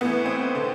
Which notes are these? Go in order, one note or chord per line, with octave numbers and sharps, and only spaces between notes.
A2 E3 B3
C4
D3